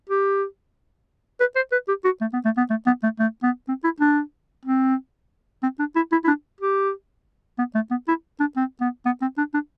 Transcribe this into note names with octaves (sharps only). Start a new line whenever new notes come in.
G4
B4
C5
B4
G4
F#4
A3
B3
A3
B3
A3
B3
A3
A3
B3
C4
E4
D4
C4
C4
D4
E4
E4
E4
D4
G4
B3
A3
B3
E4
D4
C4
B3
B3
C4
D4
D4